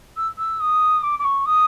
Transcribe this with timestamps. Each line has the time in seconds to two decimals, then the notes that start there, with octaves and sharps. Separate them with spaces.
0.17 E6
0.38 E6
0.60 D#6
1.03 D6
1.19 D6
1.24 C#6
1.46 D#6